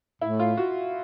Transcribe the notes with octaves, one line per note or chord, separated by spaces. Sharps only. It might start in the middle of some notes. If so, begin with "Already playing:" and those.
A2 E4
F4
F#4